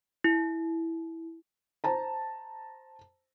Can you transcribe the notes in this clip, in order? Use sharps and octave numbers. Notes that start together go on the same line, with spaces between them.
E4
C5 A5 A#5